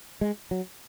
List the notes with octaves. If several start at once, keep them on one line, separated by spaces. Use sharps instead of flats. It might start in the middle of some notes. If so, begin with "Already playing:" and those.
G#3
F#3